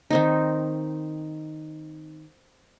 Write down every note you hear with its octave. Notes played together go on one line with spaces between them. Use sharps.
D#3 C4 D#4